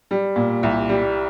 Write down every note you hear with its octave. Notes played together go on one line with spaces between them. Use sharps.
G3
A#2
C2
G3